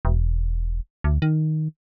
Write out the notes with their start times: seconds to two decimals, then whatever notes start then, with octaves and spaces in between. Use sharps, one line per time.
0.05 E1
1.04 D2
1.22 D#3